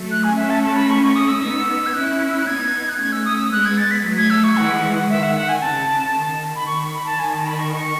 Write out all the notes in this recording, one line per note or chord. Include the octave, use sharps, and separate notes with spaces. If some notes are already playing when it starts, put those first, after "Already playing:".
Already playing: F#3 A3
F#6
G#5
A3 C#4 E5
A5
A5
B5
C#6
C#6
D#6
E6
B3 D#4
G#6
C#4 E4 F#6
E6
F#6
B3 D#4 G#6
F#6
A3 C#4 G#6
E6
D#6
E6
G#3 B3 F#6
G#6
A6
B6
F#3 A3
G#6
E6
C#6
E3 G#3 F#5
D#3 E5
F#5
F#5
G#5
C#3 A5
D#3
B5
D#3 C#6
B5
A5
D#3 G#5
A5
B5
C#6
C#6